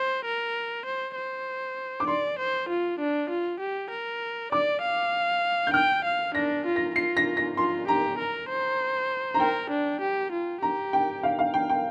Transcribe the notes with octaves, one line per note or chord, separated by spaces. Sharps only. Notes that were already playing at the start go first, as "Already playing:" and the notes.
Already playing: C5
A#4
C5
C5
D6
D5 C6
C5
F4
D4
F4
G4
A#4
D5 D6
F5
G6
G5 F6
F5
D4 A#6
F4
A#6
F4 C7
A#6
A#6
F4 C6
G4 A#5
A#4
C5
A#5
A#4 G5
D4
G4
F4
G4 A#5
G5
F5
F5
G5
G5